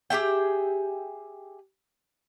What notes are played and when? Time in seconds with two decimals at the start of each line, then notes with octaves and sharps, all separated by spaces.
0.10 G4 G#4 E5 G5